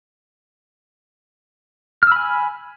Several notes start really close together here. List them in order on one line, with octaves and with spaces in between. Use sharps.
F6 E6 B5 G#5